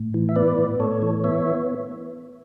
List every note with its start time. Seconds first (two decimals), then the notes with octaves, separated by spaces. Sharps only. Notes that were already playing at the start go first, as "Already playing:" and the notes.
Already playing: A2
0.14 E3
0.29 E5
0.36 B3 B4 D5
0.58 A2
0.80 A2 A4 C#5
1.02 E3
1.24 B3 C#5 E5